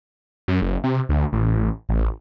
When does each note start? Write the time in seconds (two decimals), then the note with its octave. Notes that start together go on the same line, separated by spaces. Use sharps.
0.48 F#2
0.62 F#1
0.84 C3
1.09 D2
1.33 A1
1.89 A1